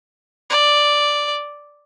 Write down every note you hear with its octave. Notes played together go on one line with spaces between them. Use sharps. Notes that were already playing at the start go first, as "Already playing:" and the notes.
D5